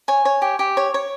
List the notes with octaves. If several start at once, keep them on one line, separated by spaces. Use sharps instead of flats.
C#5 G#5
C#5
G4
G4
C#5
C#5